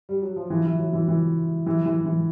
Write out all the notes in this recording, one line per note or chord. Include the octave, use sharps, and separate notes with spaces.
G3
F#3
F3
E3
E3
F#3
E3
E3
E3
E3
E3